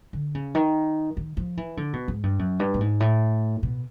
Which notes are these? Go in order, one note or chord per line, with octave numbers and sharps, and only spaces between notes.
D3
C#3
D#3
D#3
F3
E3
D3
B2
G#2
G2
F#2
G2
A2
G#2
A2
B2